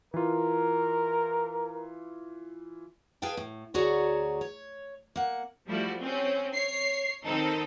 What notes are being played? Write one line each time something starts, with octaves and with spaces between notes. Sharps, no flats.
E3 F4 A#4
G#4 B4 F5 G5 A5
A2
D2 F#4 G#4 C#5 D5 A#5
C#5
A#3 F#5
F3 G3 A3 E4 F#4
C4 C#4
C#5 C7
D#3 C4 D#4 A4